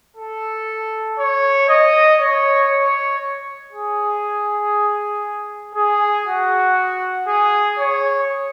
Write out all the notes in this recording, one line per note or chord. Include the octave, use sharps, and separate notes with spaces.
A4
C#5
D#5
C#5
C#5
G#4
G#4
F#4
G#4
C#5